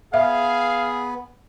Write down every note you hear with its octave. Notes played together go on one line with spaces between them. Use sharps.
B3 G#4 E5 F5